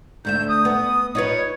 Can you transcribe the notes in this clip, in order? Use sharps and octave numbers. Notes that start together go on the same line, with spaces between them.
D2 A3 E5 G6
D#6
B3
D#4 F4 B4 C#5